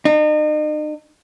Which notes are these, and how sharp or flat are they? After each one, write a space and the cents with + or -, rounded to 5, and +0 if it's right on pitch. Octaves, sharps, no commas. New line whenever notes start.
D#4 -40